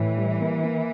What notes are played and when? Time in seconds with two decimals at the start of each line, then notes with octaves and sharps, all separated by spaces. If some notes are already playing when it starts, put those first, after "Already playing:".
Already playing: A2 E3
0.17 G3
0.40 A#3
0.63 A#3